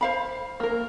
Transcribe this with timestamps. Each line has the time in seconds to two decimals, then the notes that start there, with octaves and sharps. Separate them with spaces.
0.01 C5 F5 B5
0.60 A#3 A#4